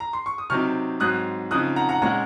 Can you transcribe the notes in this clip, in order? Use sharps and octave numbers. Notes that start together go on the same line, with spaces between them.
A#5
C6
C#6
D#6
C3 F#3 C4 D#4 C#6 F6
G#2 F#3 C4 D#6 F#6
C#3 F3 C4 D#4 D#6 F#6
F#5 A#5
F#5 A#5
A#2 G#3 C#4 F#5 A#5